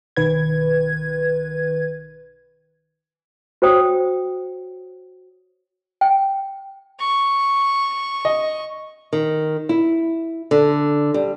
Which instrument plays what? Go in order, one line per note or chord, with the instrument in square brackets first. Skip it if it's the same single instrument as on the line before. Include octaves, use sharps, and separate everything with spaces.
[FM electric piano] B1 D#3 B4 G#6
[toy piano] F#4 C5 C#5 G5 D#6
G5
[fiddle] C#6
[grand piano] D#5
[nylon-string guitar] D#3
E4
D3
G3